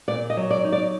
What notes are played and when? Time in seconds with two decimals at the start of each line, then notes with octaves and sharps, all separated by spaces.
0.08 A#2 D5
0.30 D#5
0.37 F#3
0.51 D5
0.64 D#4
0.72 D5